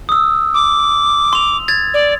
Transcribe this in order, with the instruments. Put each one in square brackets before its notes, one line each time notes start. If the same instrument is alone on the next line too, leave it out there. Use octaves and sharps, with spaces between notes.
[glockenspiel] D#6 E6
[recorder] D6
[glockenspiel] C6 F7
G#6 A6
[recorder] D5